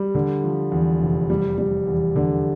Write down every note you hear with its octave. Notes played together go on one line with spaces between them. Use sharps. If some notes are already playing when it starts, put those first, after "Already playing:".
Already playing: G3
D3
F3
E2
F1
G3
G3
E2
D3